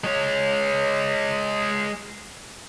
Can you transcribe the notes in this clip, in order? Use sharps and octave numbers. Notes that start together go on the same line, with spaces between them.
G#3 C#5